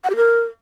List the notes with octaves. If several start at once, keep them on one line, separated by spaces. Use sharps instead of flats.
F#5
G4
A#4